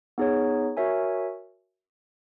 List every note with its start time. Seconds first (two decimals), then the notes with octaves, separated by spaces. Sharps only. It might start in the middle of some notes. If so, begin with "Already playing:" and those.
0.18 B3 D#4 G#4 C#5
0.77 F#4 A#4 C#5 E5 G#5